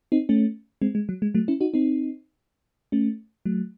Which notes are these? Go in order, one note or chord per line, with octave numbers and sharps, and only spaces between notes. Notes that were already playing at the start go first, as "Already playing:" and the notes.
C4 D#4
A3 C#4
G#3 C4
G#3
F#3
G#3
F#3 A3
C#4 E4
D#4 F#4
C4 D#4
A3 C#4
F#3 A3